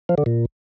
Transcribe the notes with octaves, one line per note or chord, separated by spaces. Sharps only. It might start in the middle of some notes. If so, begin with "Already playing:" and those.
F3
D3
A#2